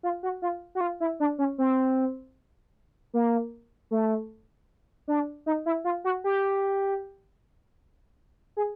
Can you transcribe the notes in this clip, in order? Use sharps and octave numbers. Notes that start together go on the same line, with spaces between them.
F4
F#4
F4
F#4
F4
E4
D4
C#4
C4
A#3
A3
D4
D#4
E4
F4
F#4
G4
G#4